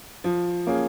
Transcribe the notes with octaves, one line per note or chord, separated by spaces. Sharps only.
F3
A#3 C#4 G#4